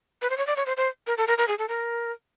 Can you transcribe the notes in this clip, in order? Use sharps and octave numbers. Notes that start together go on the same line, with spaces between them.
B4
C5
C#5
D5
C#5
C5
C5
A#4
A4
A#4
A#4
G#4
A4
A#4